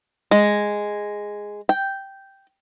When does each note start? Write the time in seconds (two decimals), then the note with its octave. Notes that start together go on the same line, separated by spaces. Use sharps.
0.31 G#3
1.69 G5